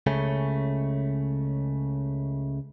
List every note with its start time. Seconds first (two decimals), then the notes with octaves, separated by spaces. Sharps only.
0.07 C#2 C#3 A3 C#4